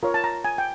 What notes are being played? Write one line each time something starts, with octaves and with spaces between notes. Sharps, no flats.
F4 A#4 C#5
A5
A#5
G#5
G5